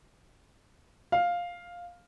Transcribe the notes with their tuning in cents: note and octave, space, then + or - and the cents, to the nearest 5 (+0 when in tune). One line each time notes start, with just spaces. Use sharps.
F5 +5